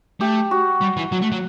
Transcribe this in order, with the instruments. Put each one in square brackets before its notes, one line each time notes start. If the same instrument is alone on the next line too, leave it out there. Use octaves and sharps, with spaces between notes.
[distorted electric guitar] A3 [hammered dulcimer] G4
[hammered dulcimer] F#4
[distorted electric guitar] G3
E3
F#3
A3
F#3